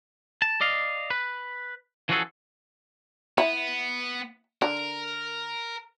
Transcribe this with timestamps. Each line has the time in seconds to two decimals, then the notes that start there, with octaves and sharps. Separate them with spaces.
0.42 A5
0.61 D5 D#5 F5
1.10 B4
2.09 E3 F3 C#4 F#4 G#4 A4
3.38 B3 E4
4.62 D3 A#4